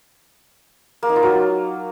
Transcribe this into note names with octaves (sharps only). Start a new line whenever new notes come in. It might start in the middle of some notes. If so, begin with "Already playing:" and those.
A#3
D#4
F4
F#3